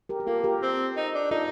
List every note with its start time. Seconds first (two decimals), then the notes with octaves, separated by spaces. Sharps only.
0.09 G4 A#4
0.20 G4
0.27 A#3 F4 A4
0.44 G4 A#4
0.62 C4
0.96 D#4
1.14 D4
1.31 D#4 F4 A4